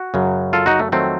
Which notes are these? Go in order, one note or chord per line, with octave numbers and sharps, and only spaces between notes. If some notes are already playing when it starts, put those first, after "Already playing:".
Already playing: F#4
F#2 C#3 F#3
F4 A4
D#4 F#4
A3
F2 D#3 F#3 A3 C4